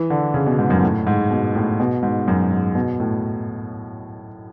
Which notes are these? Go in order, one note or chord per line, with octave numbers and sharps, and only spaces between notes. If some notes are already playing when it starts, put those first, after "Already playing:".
Already playing: E3
D3
C#3
B2
G#2
F#2
A2
G#2
B2
A2
B2
G#2
F#2
G#2
B2
A2